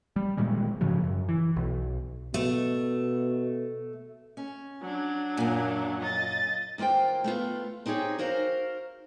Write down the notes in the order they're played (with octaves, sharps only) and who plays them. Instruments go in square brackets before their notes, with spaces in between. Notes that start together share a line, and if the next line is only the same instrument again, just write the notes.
[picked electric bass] G3
A#2 D#3 G3 G#3
G#2 C#3 F3 F#3
F#2
E3
B1
[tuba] B2 [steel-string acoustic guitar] A3
[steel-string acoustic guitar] C#4
[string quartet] F#3 D4
[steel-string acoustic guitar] F#2 A#2
[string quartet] D#5 A6
[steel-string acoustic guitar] D#2 A#3 F4 C5 G5
A3 B3 F4
C4 D#4 G4 G#4 C#5
F#4 A#4 C5 F5